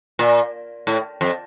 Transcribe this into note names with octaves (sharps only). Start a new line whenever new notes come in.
A#2
A2
F2